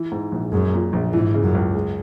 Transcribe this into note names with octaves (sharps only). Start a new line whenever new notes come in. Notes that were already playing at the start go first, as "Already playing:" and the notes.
Already playing: E3
G#2
A#1
F#2 G#3
A#2
A#1
G#2 E3
C#3
F#2
C#2
G#3